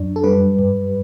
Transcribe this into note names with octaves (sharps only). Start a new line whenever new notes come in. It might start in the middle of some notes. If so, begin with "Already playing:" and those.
Already playing: F#2 D4
A4
G3 B4
G2